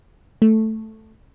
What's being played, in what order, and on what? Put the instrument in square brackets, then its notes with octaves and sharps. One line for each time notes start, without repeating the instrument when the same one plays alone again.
[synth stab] A3